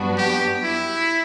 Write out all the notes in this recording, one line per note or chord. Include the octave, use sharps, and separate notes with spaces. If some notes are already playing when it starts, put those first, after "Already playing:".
Already playing: G2 F#3 B3 D4 F#4
G4
E4